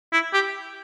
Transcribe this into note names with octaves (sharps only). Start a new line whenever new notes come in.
E4
G4